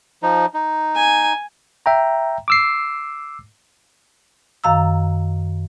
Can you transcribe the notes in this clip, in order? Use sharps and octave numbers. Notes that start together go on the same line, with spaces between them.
F3 D#4
D#4
G#5
E5 G5 A#5
D6 E6 C7
F#2 D#3 F5 A#5 E6